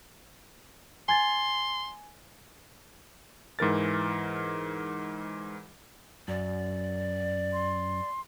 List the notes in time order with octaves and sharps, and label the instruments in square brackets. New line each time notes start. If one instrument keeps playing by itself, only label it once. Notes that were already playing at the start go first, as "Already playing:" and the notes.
[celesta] G#5 G#6 A6 [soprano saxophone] C6
[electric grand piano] G#2 E3 A#4 A6
[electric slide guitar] F#2 [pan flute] D5
[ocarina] C6